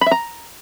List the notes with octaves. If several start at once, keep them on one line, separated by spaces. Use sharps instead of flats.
B5
E5
A#5